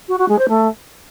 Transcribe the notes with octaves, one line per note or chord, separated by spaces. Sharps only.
F#4
F#4
G#3
C5
A3